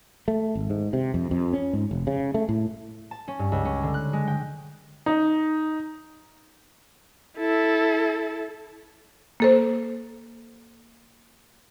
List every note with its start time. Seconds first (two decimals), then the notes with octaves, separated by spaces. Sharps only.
0.28 A3
0.55 G#1
0.70 G#2
0.93 C3
1.14 F2
1.31 F2
1.53 C#4
1.73 G#2
1.91 F1
2.07 C#3
2.34 A3
2.49 A2
3.11 A5
3.28 C#4
3.39 G2
3.52 C#2
3.65 C#4
3.83 D3
3.94 F#6
4.13 G#3
4.28 G5
5.06 D#4
7.38 E4 A4
9.40 A#3 A4 C5